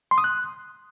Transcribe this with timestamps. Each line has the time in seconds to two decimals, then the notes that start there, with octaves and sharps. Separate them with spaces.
0.11 C6
0.18 D#6
0.24 F#6